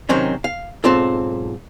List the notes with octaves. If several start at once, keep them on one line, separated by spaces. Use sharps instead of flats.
C3 D#3 F#3 C4 C#4
F5
B1 G#2 C4 F4 A4